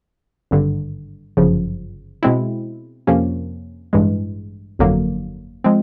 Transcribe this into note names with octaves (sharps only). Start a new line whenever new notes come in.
G#1 G2 D3
G1 F#2 C#3 F3
B2 G#3 C4 E4
F2 C3 F3 A#3 C#4
A1 G2 E3 G#3
G1 F2 D3 F#3 A#3
F3 G#3 C4